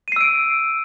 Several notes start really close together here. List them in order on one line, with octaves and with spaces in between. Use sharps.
D#7 C7 E6 D7